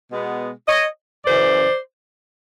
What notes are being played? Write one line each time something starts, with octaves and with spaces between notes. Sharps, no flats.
B2 G#3 B3
C#5 D#5
F#2 C#3 E3 C5 D5